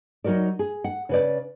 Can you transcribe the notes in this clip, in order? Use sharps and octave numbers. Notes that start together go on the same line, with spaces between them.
F#3 D#4 F#4 A#4 D5
G#4
F#5
C#3 B4 D5